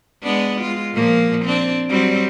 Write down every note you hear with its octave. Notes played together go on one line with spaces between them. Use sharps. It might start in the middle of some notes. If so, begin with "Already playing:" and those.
G#3 B3 D4
G#3 F4
A#2 F3 A#3
C4 D4
F#3 G3 C4